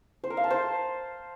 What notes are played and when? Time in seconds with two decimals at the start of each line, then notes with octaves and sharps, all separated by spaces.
0.24 C5
0.30 A#4
0.37 F5
0.44 A5
0.50 C5